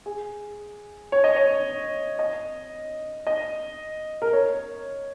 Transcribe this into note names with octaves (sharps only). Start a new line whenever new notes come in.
G#4
C#5
D#5
C#5
D#5
D#5
A#4
C#5